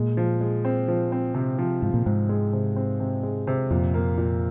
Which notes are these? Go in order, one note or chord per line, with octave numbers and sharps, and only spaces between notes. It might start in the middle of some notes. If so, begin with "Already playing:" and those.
Already playing: A#2 G#3
F3
G#3
C4
F3
C4
C3
F3
G#2 F3
A#2
G#2 C4
G#3
C3
C4
C3
G#3
C3
F2 A#2
A#3
A#2